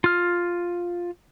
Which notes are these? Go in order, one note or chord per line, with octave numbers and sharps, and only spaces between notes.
F4 F6